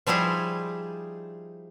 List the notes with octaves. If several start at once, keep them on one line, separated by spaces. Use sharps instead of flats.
F3 G3 D#4 E4 G#4